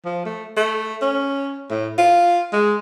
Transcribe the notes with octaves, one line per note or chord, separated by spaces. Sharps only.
F3
A3
A3
C#4
A2
F4
G#3